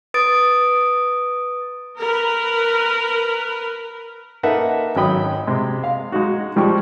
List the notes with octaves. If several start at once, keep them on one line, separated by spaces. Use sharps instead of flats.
B4 D#6 A6 D7
A#4 B4
A#3 D#4 A4 B4 E5 F#5
G#1 F#3 G5 B5 D#6
C3 G#3
F5
G#3 D#4 F#4
F3 G3 G#3 G4 C#6